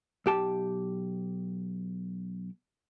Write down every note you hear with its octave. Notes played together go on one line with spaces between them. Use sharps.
B1 G4 A5